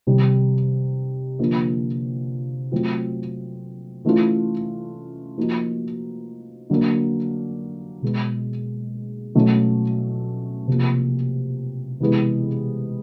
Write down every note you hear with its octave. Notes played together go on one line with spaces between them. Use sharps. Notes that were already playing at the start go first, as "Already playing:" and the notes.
C3 D#3 G3
D3 F3 A#3
F#3 A3 C4 F4
E3 A3 C#4 F4
F3 A#3 D#4 F#4
D3 F#3 A#3
B2 G#3 B3
B2 F#3 A3 C#4
C3 F3 A#3
C3 E3 G#3 B3